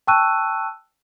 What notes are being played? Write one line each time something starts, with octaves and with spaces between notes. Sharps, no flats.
G5 A5 C#6 E6 F#6 D#7